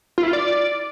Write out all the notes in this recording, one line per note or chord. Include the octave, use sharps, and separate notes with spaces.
F4
E4
F4
D5